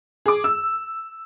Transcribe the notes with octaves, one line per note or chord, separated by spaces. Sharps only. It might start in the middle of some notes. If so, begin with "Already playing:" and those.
G#4 D6
E6